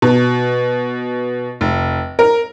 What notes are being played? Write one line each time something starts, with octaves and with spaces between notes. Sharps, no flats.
B2
F1
A#4